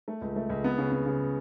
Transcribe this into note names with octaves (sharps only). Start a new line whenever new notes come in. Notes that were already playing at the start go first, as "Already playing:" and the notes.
A3
C#2
A3
C#2
B3
C#3
B3
C#3